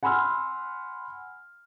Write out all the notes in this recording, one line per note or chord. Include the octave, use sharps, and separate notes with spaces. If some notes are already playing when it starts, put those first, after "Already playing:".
F#5 G#5 B5 C6 E6 F6